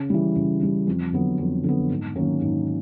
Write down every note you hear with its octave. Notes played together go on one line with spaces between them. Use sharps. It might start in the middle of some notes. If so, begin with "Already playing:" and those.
Already playing: C#3
E3 G3
C#3
E3 G3
F2
D3 F#3 B3
F2
D3 F#3 B3
G#2
D#3 F#3 A#3 C#4
G#2